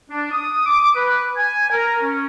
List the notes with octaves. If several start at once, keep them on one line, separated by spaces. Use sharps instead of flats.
D4
D#6
D6
B4
G#5
A#4
C#4